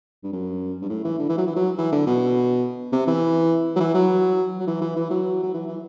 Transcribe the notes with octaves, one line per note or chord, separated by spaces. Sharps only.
G2
F#2
G2
A2
E3
D3
E3
F#3
E3
F#3
E3
D3
B2
C3
E3
F#3
E3
F#3
F#3
E3
E3
E3
F#3
F#3
E3
E3